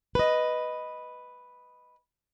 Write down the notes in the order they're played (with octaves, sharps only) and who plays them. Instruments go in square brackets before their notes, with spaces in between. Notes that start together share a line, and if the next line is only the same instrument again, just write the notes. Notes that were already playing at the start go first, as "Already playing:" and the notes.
[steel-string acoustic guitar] B4 D#5